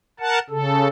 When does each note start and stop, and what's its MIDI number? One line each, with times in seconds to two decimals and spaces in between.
0.20 0.39 70
0.20 0.39 78
0.20 0.39 81
0.50 0.88 49
0.50 0.88 69